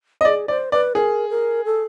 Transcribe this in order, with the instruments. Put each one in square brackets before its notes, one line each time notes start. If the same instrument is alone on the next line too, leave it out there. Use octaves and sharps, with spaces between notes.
[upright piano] D#5
[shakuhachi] G#4 [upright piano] D5
[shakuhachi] C5 [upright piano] D5
[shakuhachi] B4 [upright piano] D5
[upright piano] G#4 [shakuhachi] A#4
[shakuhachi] A#4
A4